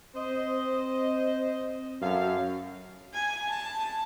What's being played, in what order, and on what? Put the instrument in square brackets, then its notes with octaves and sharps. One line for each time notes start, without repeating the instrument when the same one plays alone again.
[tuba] C4 [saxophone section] C5 D#5
[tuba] F#2 [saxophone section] A4 F5
[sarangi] G#5
A5